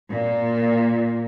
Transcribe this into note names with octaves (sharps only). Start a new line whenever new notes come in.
A#2